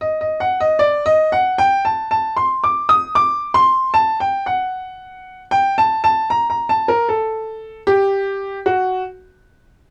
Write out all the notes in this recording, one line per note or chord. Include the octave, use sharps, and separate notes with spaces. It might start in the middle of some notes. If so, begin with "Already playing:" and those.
D#5
D#5
F#5
D#5
D5
D#5
F#5
G5
A5
A5
C6
D6
D#6
D6
C6
A5
G5
F#5
G5
A5
A5
A#5
A#5
A5
A#4
A4
G4
F#4